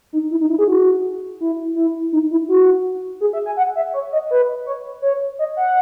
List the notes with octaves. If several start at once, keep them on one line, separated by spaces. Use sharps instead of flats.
D#4
E4
D#4
E4
G#4
F#4
E4
E4
D#4
E4
F#4
G#4
E5
G#5
F#5
E5
C#5
D#5
B4
C#5
C#5
D#5
F#5